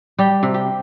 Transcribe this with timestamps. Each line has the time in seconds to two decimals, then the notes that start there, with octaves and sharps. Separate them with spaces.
0.19 G3 G4
0.43 C3
0.54 G4